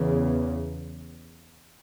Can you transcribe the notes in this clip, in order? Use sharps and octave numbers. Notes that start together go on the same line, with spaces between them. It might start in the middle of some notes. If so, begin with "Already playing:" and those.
Already playing: E2 C#3